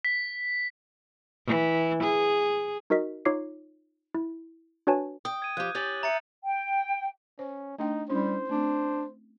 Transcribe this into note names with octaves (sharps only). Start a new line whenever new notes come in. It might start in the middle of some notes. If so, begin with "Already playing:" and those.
B6
E3
G#4
D#4 F#4 A#4 D#5 B6
D#4 F4 C#5 D6 C7
E4
D4 F#4 B4 C#5 G#5 A5
G5 D#6
G#6 D#7
F3 G4 F#6 G6
C#4 G4 C#5 G6 A6 F#7
E5 A#5 A6 C#7
G5
C#4 C5
A3 D4 D#4 G5
G3 C#4 D4 E4 C5
A3 C4 D4